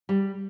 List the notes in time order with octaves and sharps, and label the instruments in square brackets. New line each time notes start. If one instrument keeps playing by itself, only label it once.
[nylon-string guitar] G3